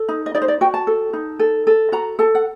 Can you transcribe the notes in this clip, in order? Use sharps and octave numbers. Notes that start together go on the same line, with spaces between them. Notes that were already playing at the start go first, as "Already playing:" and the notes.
Already playing: A4
D#4
D#5
D#4 D5
C5
D5
F#4 G5
A5
A4
D#4
A4
A4
F#4 A#5
A4 A5
F#5